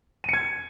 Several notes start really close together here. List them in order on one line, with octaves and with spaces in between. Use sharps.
D#7 C#7 G#6